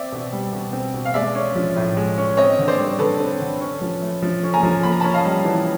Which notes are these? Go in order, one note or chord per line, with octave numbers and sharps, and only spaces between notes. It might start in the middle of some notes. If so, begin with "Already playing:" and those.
Already playing: C4 D5 E5
B2
G3
B2
C4
B2
F5
G#3 D5 E5
C#4
F3
A2
G#3
C#4
C4 C#5 D#5
D3
C5 D5
G3
D3 A4 B4
C4
D3
C#4
F3
A3
F3
C#4
G#5 A#5
F3
A#3 B5
A#5
C#4 A5 B5
D#5 F5
G3
E3